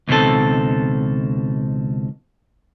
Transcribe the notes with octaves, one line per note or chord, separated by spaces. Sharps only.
C#2 B2 D#3 C4 A4